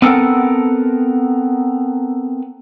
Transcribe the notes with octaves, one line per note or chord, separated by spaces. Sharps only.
B3 C4 A4 A#4 F#5